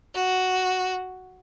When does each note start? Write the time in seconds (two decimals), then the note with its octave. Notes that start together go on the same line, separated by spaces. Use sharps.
0.15 F#4